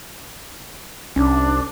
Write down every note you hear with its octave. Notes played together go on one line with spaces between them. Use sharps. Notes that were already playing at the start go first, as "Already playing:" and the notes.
C2 C#4 D4